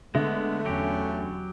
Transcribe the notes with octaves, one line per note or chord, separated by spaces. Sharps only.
D3 G#3 A3 B3 E5
E2 F#3 C#4 G4